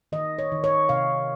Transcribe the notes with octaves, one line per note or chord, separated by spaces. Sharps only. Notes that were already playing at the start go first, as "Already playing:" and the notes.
D#3 D#5
C#5
D#3
C#5
C3 F5